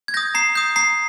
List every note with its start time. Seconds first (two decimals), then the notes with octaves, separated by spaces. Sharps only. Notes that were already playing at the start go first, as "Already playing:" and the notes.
0.08 G#6
0.14 D#6 G6 A#6
0.35 A#5 C7
0.55 D#6 G6
0.76 A#5 C7